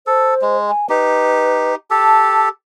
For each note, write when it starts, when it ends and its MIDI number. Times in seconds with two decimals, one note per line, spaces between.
0.07 0.34 69
0.07 0.57 72
0.42 0.71 56
0.69 0.89 80
0.90 1.75 63
0.90 1.75 67
0.90 1.73 71
1.91 2.49 67
1.91 2.49 69
1.91 2.41 81